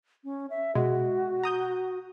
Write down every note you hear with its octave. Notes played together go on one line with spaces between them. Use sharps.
C#4
E5
B2 G#3 F#4
A#5 D#6 G6